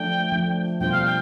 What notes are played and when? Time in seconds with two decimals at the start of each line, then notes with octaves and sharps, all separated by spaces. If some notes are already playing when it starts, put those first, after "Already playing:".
Already playing: F3 A3 D4 G5
0.32 F3 A3 D4
0.80 B2 G3 D4 F4 C5 G5
0.92 F5
1.05 G5